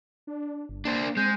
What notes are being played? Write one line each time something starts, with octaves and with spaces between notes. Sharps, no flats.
D4
G1
A#3 D4 C5
G#3 C4 G6